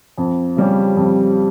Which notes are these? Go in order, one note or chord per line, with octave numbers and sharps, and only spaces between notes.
F2
C#3 G3 C#4 G4
F2